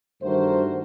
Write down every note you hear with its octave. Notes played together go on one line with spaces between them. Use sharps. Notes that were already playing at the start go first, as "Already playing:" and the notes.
G2 D#3 A3 F#4 A#4 C5